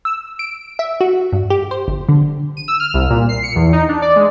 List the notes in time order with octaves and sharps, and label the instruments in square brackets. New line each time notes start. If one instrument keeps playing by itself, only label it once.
[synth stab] E6
D7
E5
F#4
G2
G4
C5
G1
D3
[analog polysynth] D#7
E6
F6
C2
A#2
C7
C#7
E2
D#4
D4
D5
G#3